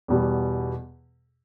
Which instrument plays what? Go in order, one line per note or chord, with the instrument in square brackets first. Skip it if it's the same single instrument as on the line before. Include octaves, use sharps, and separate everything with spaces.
[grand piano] E2 B2 G3 B3